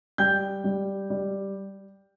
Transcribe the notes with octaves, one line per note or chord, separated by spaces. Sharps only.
G3 G5 G6
G3
G3